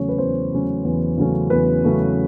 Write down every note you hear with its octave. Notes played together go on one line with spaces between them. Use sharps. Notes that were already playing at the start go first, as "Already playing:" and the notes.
Already playing: E2 C#3 F#3 A3 C#4 C#5
B4
E2 C5
C#3 F#3 A3 C#4
E2
C#3 F#3 A3 C#4
E2 B4
C#3 F#3 A3 C#4